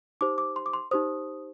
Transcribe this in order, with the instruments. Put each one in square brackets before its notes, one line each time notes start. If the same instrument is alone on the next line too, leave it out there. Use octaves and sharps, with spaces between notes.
[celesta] D#4 G4 C5 D6
D6
C6
D6
C6
D#4 G4 C5 D#6